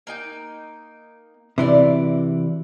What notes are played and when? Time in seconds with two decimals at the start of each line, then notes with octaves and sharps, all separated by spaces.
0.07 A#3 D#4 G5
1.58 C3 E3 F#4 D5